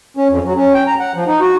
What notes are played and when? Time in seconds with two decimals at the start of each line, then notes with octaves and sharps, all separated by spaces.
0.17 C#4
0.30 F2
0.44 F#3
0.56 C#4
0.74 G5
0.87 A#5
1.00 F#5
1.15 F3
1.27 D#4
1.41 F#4